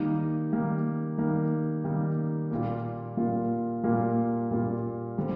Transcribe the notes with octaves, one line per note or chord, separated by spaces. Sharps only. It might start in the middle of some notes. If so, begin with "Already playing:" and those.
Already playing: D#3 G3 A#3 D#4
D#3 G3 A#3 D#4
D#3 G3 A#3 D#4
D#3 G3 A#3 D#4
A#2 G3 A#3 F4
A#2 G3 A#3 F4
A#2 G3 A#3 F4
A#2 G3 A#3 F4
D3 G3 C4